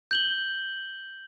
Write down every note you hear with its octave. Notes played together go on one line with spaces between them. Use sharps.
G6 F#7 G7